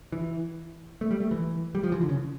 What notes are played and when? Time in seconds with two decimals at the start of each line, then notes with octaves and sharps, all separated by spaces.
0.12 E3
1.01 A3
1.11 G3
1.20 A3
1.31 E3
1.75 G3
1.83 F3
1.92 E3
2.01 D3
2.09 C#3